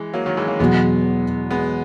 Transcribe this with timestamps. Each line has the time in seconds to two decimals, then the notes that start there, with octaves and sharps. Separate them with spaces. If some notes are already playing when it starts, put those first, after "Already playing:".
Already playing: E3 G#3
0.14 F#3 A#3
0.26 D#3 F#3
0.37 E3 G#3
0.48 A#3 C#4
0.59 E2 B2 F#3 G#3 B3
1.51 G#3 B3